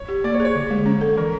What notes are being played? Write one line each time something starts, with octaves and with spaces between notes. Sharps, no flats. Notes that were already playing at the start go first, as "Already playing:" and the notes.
Already playing: C#5
G4
A#3 D5
C#5
G#4
C#5
D3
G#3
C#4
A4
E3 A#4